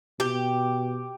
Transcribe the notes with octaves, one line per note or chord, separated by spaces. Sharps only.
B2 G4